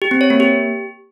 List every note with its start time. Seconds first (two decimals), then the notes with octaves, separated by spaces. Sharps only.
0.02 G4
0.11 C4
0.21 C#5
0.30 A#3
0.40 G4